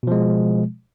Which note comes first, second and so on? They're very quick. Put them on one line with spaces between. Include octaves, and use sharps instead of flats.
B2 F3 G#3